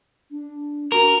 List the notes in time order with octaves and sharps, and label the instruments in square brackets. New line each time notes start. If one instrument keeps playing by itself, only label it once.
[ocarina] D4
[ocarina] F#4 [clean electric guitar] A#4